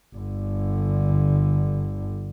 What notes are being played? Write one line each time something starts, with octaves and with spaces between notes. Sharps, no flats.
G1 D3